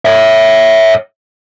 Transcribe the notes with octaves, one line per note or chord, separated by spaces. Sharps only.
C#5 E5